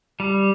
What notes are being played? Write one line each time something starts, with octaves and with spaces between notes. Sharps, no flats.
G3